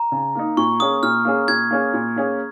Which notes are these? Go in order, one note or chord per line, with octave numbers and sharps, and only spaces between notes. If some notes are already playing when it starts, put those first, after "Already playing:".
Already playing: A#5
C#3
A#3 D#4
A#2 C#6
A#3 C#4 G#4 D#6
A#2 F6
A#3 C#4 G#4
A#2 G#6
A#3 C#4 G#4
A#2
A#3 C#4 G#4